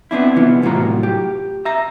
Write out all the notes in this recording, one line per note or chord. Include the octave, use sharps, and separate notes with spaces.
B3 C4 D4 E4
C2 E3 B3 F4
C2 A2 F#3 F4 A#5
G4
E5 A#5